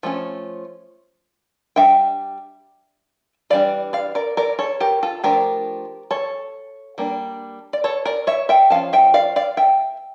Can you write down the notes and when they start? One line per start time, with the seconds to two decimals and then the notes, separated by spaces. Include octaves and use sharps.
0.03 F3 A3 C#4
1.76 G3 D4 E5 G5
3.50 E3 G3 D4 D5 F5
3.93 D5 F5
4.15 A#4 D5
4.37 A#4 D5
4.59 A4 C#5
4.80 G4 A#4
5.03 F4 A4
5.24 F3 A3 D4 G4 A#4
6.11 A4 C#5
6.98 G3 A#3 D4
7.73 D5
7.84 A4 C#5
8.05 A#4 D5
8.27 C#5 E5
8.49 E5 G5
8.70 F3 C#4 F5 A5
8.93 E5 G5
9.14 D5 F5
9.36 D5 F5
9.57 E5 G5